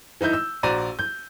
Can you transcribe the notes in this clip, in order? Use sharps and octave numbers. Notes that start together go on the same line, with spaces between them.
E3 D#4 E4 G6
E6
A#1 F#4 C5 D5 A#5 D#7
G6